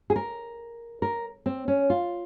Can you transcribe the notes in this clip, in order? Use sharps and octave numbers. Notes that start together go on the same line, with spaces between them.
G#4
A#4
A#4
C4
C#4
F4